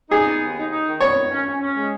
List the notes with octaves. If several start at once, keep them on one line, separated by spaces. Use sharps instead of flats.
D#4 G#4
B3
D#2
D#4
D#4
D#3
B3 C#5
D#3
C#4
C#4
C#4
G#3